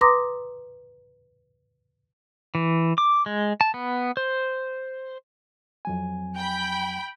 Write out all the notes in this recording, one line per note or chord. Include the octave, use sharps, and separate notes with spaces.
B4 A#5 C6 D6 D#6 A#6
E3
D6
G#3
A5
B3
C5
F2 F#3 G#5
G5 B5